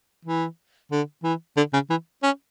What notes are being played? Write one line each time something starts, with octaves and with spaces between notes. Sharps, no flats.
E3
D3
E3
D3
C#3
E3
C#4